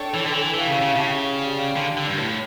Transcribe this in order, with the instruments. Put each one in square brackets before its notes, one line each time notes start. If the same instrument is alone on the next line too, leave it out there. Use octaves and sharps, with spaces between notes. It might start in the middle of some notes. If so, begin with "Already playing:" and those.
Already playing: [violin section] D4 A4 C#5 G5
[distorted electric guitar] E3
D3
E3
[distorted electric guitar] E3 [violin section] E4 G4 C#5 F5 A5
[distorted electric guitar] C#3
C#3
C#3
[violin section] G4 D5 F5
[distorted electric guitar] D3
D3
G2
A2